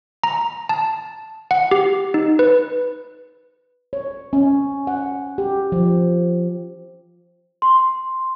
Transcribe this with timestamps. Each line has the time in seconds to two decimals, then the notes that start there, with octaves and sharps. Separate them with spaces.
0.24 A#5
0.69 A5
1.51 F#5
1.71 G4
2.14 D#4
2.39 B4
3.93 C#5
4.33 C#4
4.87 F#5
5.38 G4
5.72 F3
7.62 C6